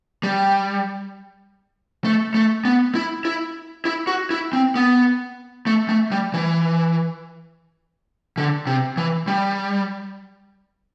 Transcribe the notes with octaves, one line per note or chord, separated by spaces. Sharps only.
G3
A3
A3
B3
E4
E4
E4
F#4
E4
C4
B3
A3
A3
G3
E3
D3
C3
E3
G3